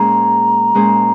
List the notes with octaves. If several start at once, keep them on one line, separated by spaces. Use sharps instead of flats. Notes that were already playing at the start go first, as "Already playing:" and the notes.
Already playing: A#2 G#3 C#4 G#4 C5 A#5
A#2 G#3 C#4 G#4 C5